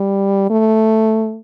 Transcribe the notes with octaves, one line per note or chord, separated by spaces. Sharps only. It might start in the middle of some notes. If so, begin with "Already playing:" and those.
Already playing: G3
A3